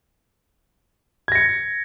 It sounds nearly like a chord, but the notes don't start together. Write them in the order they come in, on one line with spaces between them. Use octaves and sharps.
G#6 A#6 C#7